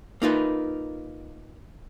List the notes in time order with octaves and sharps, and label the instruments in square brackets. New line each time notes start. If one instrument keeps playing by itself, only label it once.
[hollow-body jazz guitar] A#3 D#4 F4 B4